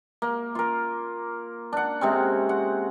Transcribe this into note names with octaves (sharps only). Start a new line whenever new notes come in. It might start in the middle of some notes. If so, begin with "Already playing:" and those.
A#3
F4 A#4
D4 F#5
C3 G#3 C4 C#4
F#5